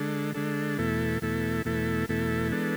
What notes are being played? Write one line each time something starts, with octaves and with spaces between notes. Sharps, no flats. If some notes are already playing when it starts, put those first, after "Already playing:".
Already playing: D3 G#3 D4 A4
D3 G#3 D4 A4
E2 B2 A3 E4 A4
E2 B2 A3 E4 A4
E2 B2 A3 E4 A4
E2 B2 A3 E4 A4
E3 G#3 B3 D4 A4